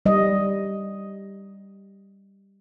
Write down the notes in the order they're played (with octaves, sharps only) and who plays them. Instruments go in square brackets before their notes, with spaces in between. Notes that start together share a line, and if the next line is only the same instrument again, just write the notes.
[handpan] G3 D#5